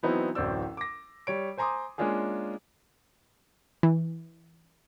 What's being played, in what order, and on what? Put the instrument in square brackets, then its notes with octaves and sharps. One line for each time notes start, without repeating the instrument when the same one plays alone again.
[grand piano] E3 F#3 B3 C4 D#4 E4
D1 A1 F#3 C5 D5 E6
D6 A#6
G3 C#5 D7
C5 G#5 A#5 C6 D6 D#6
G#3 A#3 C#4 D4 F4 G#4
[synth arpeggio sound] E3